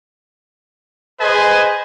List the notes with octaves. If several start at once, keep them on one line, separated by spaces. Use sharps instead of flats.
G#4 B4 C5 D#5 G#5